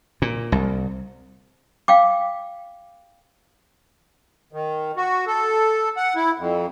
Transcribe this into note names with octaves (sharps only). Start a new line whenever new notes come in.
A#2
C2
F5 G5 D6
D#3
F#4
A4
F#5
E4
F2